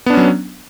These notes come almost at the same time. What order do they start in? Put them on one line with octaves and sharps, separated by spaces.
B3 D4 C#4 F#3